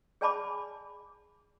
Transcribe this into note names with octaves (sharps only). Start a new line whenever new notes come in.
G#4 D5 G#5 A5 B5 D6